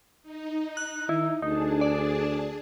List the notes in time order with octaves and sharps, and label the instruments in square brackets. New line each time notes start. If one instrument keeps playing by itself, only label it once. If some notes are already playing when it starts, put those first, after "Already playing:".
[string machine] D#4
[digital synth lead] F#6
[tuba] D#3 [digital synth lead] E4
[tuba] D2 [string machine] D4 G#4 A5 [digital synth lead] D#4
[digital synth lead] D5